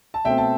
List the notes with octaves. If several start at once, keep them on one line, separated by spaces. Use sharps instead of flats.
A5
B2 A3 C4 E5 G5
A5